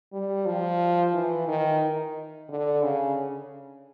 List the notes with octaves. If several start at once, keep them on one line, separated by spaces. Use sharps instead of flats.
G3
F3
E3
D#3
D3
C#3